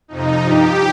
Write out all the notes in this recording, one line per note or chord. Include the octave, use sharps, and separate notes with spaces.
F2 C3 F3 D#4
G2 F3 G4